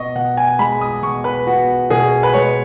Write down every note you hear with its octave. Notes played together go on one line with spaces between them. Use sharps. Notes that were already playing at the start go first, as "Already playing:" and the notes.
Already playing: B2 B3 D#5 C#6
B2 F#5
G#5
G#3 B5
D#6
B2 C#6
B4
B3 F#4
B2 G#4
B4
G#3 C#5